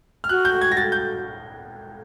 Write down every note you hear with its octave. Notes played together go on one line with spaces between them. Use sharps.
F6
F#4 F#6
G6
G#6
A#6
F#4 A6
G6